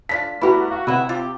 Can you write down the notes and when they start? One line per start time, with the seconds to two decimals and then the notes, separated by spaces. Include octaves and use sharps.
0.09 A3 D4 F4 B6
0.42 G3 A3 B3 E4 F#4 G4 A#4
0.71 F#4 F5
0.87 C3 E4 B4 D#5 F#5
1.09 F4 G4